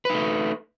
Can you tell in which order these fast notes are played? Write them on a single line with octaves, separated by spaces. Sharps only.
B4 D#4 A3